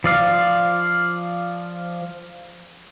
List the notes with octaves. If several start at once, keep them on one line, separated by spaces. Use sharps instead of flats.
F3 D5 F5